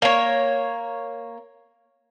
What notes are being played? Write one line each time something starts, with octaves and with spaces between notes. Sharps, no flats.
A#3 C#5